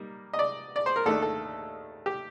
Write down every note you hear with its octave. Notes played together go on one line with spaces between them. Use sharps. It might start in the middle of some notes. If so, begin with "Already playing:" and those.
Already playing: G3 A#3 D#4
D#5
D5
D5
C5
A#4
D#2 D#3 A3 D4 A4
A4
G4